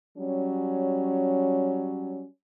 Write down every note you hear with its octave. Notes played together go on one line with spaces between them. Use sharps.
F#3 G3 C#4